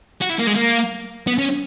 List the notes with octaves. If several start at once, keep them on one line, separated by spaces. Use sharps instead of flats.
F#4
E4
A#3
G#3
A#3
B3
C#4